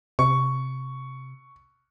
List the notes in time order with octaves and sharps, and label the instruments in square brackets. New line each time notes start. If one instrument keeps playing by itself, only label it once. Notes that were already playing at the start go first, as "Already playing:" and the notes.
[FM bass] C3 [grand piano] C#6